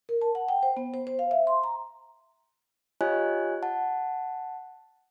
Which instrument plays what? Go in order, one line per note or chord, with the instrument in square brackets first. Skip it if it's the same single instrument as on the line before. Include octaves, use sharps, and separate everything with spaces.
[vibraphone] A#4
A5
F#5
G5
C5
B3
C5
C5
F5
E5
C6
A#5
[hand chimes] F4 G4 C#5 D#5 G#5 F#6
F#5 A5